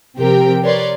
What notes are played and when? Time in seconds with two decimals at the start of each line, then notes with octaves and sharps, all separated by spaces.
0.18 C3 F3 C4 G4 A#4 G5
0.64 A#4 B4 C#5 D5 C6